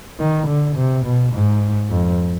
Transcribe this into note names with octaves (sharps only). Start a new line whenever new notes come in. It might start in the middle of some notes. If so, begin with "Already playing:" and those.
D#3
D3
C3
B2
G#2
F2